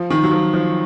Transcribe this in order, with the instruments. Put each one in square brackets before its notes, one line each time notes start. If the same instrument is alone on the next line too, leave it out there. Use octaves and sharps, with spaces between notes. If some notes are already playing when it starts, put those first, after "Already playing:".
Already playing: [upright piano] F3
D#3
F#3
F3
F3